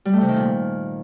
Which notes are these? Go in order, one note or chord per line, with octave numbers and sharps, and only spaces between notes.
G3
A3
C3
D#3
A#2